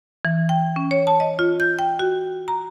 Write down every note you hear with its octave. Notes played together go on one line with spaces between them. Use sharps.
E3
G5
C#4
C#5
A5
D#5
F4
G6
G5
F#4
A#5